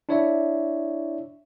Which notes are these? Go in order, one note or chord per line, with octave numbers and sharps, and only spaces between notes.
D4 E4 C#5 D5 E5